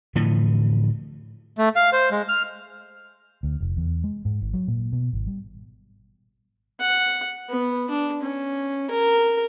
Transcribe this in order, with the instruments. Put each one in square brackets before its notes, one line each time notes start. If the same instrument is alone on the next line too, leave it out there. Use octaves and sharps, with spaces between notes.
[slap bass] A2 D3 E3 F3
[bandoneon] A3
F5
C5
G#3
F6
[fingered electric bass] D2
F1
E2
G#3
G#2
G#1
F#3
A#2
B2
G#1
G3
[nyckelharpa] F#5
B3
D4
C#4
A#4